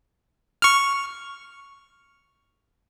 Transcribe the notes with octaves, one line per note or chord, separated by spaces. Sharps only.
C#6 F6